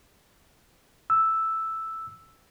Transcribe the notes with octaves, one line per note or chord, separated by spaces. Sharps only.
E6